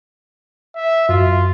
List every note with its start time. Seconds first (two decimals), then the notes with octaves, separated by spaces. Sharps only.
0.75 E5
1.09 F#2 F4